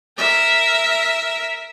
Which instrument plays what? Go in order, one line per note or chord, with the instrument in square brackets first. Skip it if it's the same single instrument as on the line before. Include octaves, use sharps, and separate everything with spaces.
[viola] A#4 E5